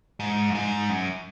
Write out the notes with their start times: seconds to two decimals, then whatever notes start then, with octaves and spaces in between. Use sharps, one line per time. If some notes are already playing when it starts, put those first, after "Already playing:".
0.20 G#2
0.50 F#2
0.55 G#2
0.89 F#2